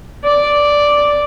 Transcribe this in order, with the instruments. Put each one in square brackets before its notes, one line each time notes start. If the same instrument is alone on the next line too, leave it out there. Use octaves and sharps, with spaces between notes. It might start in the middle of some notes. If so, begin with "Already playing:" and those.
[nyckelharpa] D5